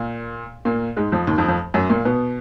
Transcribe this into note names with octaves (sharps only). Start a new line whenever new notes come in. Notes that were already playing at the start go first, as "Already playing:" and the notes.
Already playing: A#2 A#3
A#2 A#3
G#2 G#3
F2 F3
D#2 D#3
F2 F3
F2 F3
F#2 F#3
A#2 A#3
B2 B3